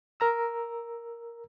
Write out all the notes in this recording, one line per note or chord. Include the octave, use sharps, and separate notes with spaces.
A#4 A#5 E6